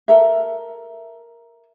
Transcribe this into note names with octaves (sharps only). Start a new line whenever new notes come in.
A4 A#4 E5